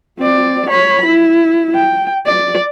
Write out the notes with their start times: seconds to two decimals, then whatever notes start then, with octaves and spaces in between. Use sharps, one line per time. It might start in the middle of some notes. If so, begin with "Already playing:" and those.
0.18 C4 D5
0.69 C#5 B5
1.06 E4
1.75 G5
2.26 D5